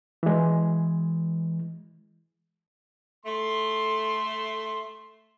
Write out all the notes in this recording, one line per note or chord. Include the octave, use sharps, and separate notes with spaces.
E3 G#3
A3 C6